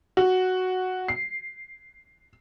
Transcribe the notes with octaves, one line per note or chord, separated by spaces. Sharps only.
F#4
C7